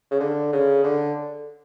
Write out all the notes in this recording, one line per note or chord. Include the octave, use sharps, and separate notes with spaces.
C#3
D3
C#3
D3